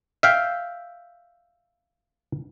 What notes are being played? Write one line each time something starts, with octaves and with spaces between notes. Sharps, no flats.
E5 F5 G5